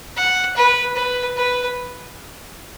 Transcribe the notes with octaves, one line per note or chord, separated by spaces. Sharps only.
F#5
B4
B4
B4